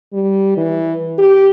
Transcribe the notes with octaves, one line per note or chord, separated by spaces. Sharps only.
G3
E3
G4